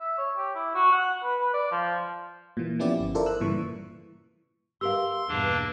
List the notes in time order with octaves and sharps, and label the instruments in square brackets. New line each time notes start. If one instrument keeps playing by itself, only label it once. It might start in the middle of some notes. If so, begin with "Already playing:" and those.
[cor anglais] E5
C#5
G4
E4
F#4
F#5
B4
B4
D5
F3
[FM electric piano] A#2 E3
F3 B3 C#4 E4 G4 D5
G1
E4 F4 A4 A#4 C5 D5
E6 F#6
G2 A#2 C#3 E3 C#6
[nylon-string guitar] G4 A#4 F5 [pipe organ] C6 [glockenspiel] E6
[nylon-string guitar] E2 G2 B2 [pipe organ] A#3 D4